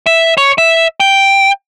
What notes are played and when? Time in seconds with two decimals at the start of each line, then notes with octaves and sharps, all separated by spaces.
0.06 E5
0.37 C#5
0.58 E5
1.00 G5